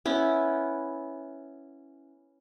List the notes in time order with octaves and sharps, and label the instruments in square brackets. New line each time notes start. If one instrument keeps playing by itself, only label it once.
[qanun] B3 C#4 E4